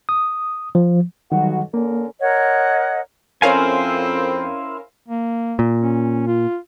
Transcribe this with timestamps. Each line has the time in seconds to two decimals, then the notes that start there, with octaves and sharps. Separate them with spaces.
0.09 D#6
0.75 F3
1.32 B1 D#3 F#3 G3 F#4
1.74 D3 A#3 C#4 A#4
2.21 A#4 C#5 D#5 F#5
3.42 F2 C4 C#4 E4 A#4 C5 F5 G#5
5.08 A#3
5.59 A#2
5.82 C#4
6.27 F4